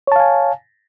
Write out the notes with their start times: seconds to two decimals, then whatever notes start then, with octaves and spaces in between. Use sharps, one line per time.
0.07 C#5
0.12 A5
0.16 F5
0.20 G#5